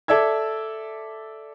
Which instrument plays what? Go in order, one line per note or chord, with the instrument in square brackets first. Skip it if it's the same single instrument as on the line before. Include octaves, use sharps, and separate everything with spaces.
[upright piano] A4 D5 E5 E6 G#6